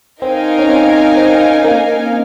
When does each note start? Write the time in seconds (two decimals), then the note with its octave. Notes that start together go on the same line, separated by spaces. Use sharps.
0.22 C4 D#4 A#4 F5 G#5
0.59 C#4
0.69 C4
1.17 C4
1.65 A#3